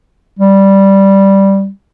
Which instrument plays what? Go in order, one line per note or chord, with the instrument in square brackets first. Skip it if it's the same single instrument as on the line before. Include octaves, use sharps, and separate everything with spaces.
[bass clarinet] G3